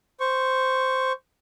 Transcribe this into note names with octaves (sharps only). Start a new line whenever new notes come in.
C5 C#6